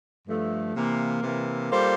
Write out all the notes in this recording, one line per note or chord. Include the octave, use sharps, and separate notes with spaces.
G2 F3 A3
C3 E3 A#3
C3 E3 A#3
G3 A#3 F4 A4 C5